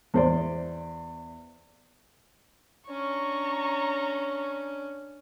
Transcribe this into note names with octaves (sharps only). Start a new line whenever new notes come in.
E2 C5 D5
C#4 D4 A#5 C#6